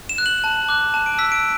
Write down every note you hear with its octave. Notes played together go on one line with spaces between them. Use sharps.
E7
F#6
F#7
A5
D6 F#6
A5 E7
D7
E6 B6
D7